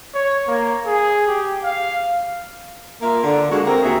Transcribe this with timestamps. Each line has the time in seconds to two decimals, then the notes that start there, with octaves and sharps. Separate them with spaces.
0.15 C#5
0.47 A#3
0.86 G#4
1.27 G4
1.64 F5
3.01 A#3 F4 A#4 E5
3.23 D3
3.51 G#3 A#3 F#4
3.65 C4 A#4
3.82 D#2 F#4 G#4 E5